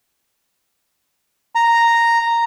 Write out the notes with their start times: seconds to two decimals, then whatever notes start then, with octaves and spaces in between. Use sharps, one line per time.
1.55 A#5